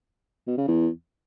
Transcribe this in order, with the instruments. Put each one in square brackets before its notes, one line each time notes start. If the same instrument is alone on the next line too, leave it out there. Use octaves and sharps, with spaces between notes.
[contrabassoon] B2
C#3
E2